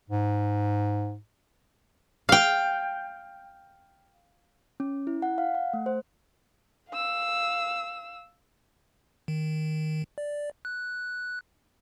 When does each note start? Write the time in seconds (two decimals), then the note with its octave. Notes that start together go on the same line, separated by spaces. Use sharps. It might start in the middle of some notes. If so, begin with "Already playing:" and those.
0.10 G#2
2.29 F5 G5
4.80 C#4
5.07 E4
5.22 F#5
5.38 F5
5.55 F#5
5.74 A3
5.86 C5
6.90 F5 E6
9.28 D#3
10.18 D5
10.65 F#6